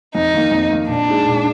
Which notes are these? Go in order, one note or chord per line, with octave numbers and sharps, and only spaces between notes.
F2 D#4
D#3 A#3
F2
D#3 A#3
A#2 D4
G#3 D#4
A#2